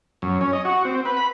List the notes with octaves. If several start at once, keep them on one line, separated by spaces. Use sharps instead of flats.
F#2
C#4
D#5
F#4
C4
B4
B5